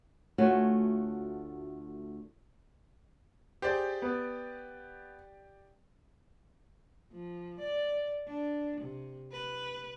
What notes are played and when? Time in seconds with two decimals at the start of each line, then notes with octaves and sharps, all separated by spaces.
0.38 D2 A3 F4 F#4 C#5 G#5
3.62 G4 G#4 C5 D5
4.02 B3
7.12 F3
7.60 D5
8.27 D4
8.81 C3
9.32 B4